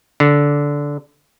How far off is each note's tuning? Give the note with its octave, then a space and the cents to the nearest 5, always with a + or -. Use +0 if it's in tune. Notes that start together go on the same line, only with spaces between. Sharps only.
D3 -15